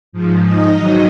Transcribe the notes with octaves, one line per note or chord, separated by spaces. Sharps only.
G#2 F3
D#4 D#5
G#2 D#3 F#3